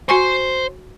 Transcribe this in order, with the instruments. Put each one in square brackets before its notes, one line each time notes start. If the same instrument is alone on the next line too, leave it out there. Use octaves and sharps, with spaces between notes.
[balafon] F#4 G#5 C#6 [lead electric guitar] C5 C6